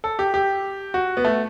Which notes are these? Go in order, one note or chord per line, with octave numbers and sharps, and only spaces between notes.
A4
G4
G4
F#4
B3
A3